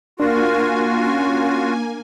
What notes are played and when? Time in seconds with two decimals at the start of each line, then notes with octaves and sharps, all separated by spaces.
0.20 A#3 D4 F4 F#4 A#4 G#5
1.03 C#4